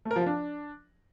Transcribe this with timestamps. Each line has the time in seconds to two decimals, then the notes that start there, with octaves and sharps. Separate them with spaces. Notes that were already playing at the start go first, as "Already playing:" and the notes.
0.05 A3
0.11 A#4
0.16 F3
0.21 F4
0.26 D4